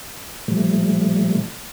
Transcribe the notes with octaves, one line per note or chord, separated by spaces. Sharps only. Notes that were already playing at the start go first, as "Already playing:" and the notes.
A#2 F3 G3 A3